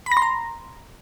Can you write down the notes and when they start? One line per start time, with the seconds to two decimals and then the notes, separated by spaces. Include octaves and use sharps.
0.06 B5
0.12 A#6
0.17 C6
0.22 A#5